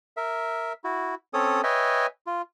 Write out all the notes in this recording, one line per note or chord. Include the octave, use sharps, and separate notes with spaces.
A#4 E5
E4 F#4
C4 C#4 A4 C#5 D#6
B4 C#5 D#5 E5 G5 G#5
F4